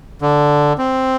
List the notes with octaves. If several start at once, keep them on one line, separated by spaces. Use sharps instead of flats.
D3
C4